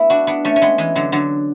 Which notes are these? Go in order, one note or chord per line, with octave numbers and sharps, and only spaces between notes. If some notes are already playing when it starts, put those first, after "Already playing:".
Already playing: A3 B3 E4
D4 F#4
B3 D4
A3 C#4
C#4
G#3 B3
E3 G#3
D3 F#3
D3 F#3